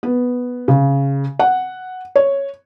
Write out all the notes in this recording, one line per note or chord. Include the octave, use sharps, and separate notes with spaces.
B3
C#3
F#5
C#5